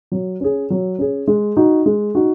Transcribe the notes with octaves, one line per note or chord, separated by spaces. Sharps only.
F#3
C#4 G#4
F#3
C#4 G#4
G#3
D#4 F#4
G#3
D#4 F#4